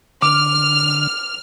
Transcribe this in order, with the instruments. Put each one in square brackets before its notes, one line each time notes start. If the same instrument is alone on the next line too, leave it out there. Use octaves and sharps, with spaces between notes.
[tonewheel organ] D3 [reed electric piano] D6 [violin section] F6